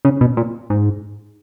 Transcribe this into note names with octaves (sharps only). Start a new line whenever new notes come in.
C#3
B2
A#2
G#2